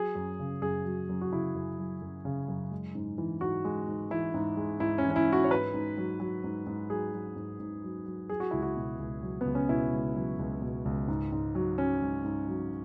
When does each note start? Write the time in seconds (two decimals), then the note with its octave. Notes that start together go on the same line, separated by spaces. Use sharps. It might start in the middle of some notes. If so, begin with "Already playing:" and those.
Already playing: F#3 G#4
0.15 F#2
0.40 C#3
0.62 F#2 G#4
0.85 F#3
1.09 F#2
1.21 F#4
1.32 C#3 E4
1.55 F#2
1.79 F#3
2.02 F#2
2.25 C#3
2.48 F#2
2.71 G#3
2.95 G#2
3.18 E3
3.41 G#2 F#4
3.65 G#3
3.88 G#2
4.11 E3 E4
4.34 G#2
4.57 G#3
4.80 G#2 E4
4.98 C#4
5.04 E3
5.10 C#4
5.16 E4
5.27 G#2
5.33 F#4
5.44 C#5
5.51 G#2 B4
5.74 G#2
5.98 F#3
6.20 F#3
6.44 G#2
6.66 G#2
6.90 F#3 G#4
7.13 F#3
7.36 G#2
7.60 G#2
7.84 F#3
8.06 F#3
8.29 F#3 G#4
8.40 F#4
8.51 C#2 E4
8.62 F#4
8.76 B2
8.99 C#2
9.23 F#3
9.41 C#2 B3
9.55 C#4
9.69 B2 E4
9.93 C#2
10.16 F#3
10.39 C#2
10.62 B2
10.85 C#2
11.08 G#2
11.32 G#2
11.55 F#3
11.78 F#3 C#4
12.02 G#2
12.24 G#2
12.48 F#3